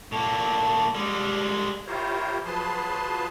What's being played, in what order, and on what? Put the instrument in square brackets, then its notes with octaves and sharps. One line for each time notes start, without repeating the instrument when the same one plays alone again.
[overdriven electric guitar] A2 A#3
G3 G#3
[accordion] E4 F4 G4 A#4 C5 C#5
F3 F#3 G#4 B4 A5 C6